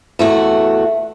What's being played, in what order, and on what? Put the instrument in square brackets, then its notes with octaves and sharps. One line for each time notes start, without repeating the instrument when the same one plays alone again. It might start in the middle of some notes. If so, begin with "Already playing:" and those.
[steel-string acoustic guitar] E2 A3 F#4